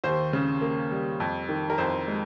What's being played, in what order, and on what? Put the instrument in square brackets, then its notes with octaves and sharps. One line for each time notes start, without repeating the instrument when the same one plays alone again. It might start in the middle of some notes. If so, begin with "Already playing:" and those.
[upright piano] D#2 C5
C#3
A#3
G3
F2
D#3
A#4
F2 C5
G#3